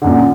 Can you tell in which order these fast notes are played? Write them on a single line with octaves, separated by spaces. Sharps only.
D3 F#2 A#2